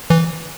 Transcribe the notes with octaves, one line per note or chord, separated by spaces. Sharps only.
E3